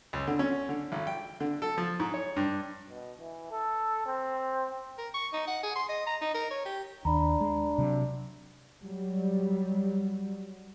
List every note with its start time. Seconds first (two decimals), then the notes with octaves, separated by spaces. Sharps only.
0.13 C#2
0.28 D3
0.39 C#4
0.69 D3
0.92 G#1
1.07 G5
1.41 D3
1.62 A4
1.78 F3
2.00 G#2
2.14 C#5
2.36 G2
2.89 B2
3.20 E3
3.51 A4
4.06 C4
4.98 A#4
5.14 C#6
5.33 D#4
5.47 F#5
5.63 G#4
5.76 C6
5.89 D#5
6.06 A#5
6.21 D#4
6.34 A#4
6.51 C#5
6.66 G4
7.05 D#2 D4 A#5 B5
7.41 G#3
7.78 C3 F#3
8.85 F#3 G3